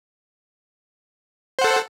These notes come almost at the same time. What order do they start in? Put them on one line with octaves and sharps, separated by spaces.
C5 F#5 A4